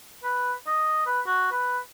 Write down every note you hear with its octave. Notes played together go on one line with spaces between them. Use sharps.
B4
D#5
B4
F#4
B4